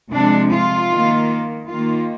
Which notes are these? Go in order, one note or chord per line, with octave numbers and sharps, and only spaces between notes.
C3 F3 G#3 D4
F4
D#3 A#3
D#3 A#3 F4